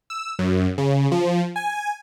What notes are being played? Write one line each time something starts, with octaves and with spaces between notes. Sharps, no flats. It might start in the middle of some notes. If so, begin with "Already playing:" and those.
E6
F#2
C#3
F3
G#5